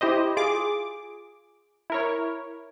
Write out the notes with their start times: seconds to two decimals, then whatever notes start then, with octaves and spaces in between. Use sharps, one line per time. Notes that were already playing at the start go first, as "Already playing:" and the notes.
0.01 E4 G4 C5 D#5
0.37 F4 G#4 D6
1.90 E4 A#4 C#5